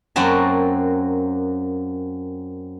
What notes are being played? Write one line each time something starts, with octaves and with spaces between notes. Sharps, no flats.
F#2 A#3 C4 F#4 A5